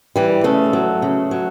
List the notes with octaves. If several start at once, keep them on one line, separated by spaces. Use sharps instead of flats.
E3 G3
C#3 A3
F#3
C#3
F#3